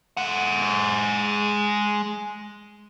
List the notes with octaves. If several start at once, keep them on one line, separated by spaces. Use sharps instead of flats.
G#3 F#5